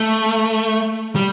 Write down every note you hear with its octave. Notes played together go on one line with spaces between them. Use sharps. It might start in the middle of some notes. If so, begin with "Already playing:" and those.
Already playing: A3
G3